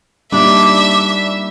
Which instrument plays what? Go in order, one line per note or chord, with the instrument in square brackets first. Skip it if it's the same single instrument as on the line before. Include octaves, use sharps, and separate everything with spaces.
[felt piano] A#2 G3 D#4 [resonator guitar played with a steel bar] D4 [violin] E5 [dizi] D6